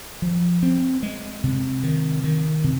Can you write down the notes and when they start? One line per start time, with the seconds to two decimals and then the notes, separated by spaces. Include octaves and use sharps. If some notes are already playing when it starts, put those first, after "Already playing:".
0.22 F3
0.63 C4
1.03 G#3
1.44 C3
1.84 D#3
2.24 D#3
2.64 C3